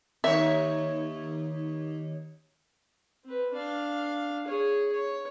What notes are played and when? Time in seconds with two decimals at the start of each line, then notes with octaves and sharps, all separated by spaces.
0.24 D#2 D#4 C#5 E5
3.24 C4 B4
3.53 D4 F5
4.47 G#4 C#5
4.92 C#5